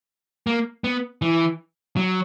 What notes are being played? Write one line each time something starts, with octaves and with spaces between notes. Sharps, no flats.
A#3
B3
E3
F#3